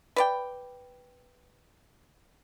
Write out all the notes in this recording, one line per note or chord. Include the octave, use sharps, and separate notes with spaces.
B4 D5 G5